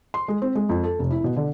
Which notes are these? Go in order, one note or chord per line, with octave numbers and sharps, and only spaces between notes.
C6
G#3
C4
G#3
F2
A4
F1
E4
B2
D3